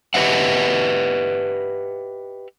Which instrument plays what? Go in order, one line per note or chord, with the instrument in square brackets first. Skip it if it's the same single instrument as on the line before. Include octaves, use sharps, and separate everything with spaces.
[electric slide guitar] G4 B4 D#5 E5 F#5